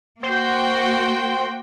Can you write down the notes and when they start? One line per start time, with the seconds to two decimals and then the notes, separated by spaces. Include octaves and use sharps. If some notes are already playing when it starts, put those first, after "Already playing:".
0.23 A#3 F#4 C5 G5